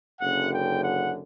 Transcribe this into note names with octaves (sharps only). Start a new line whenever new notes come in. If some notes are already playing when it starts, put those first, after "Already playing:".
F#1 F#2 D3 F#5
G5
F#5